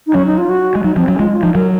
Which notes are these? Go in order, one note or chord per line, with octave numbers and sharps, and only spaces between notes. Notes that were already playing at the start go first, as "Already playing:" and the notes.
D#4
F#3 C#4
D#4
F4
F#4
G#3
F#3 D#4
F3 C4
F#3 C#4
G#3 F4
F4
F3 D#4
F#3 A#4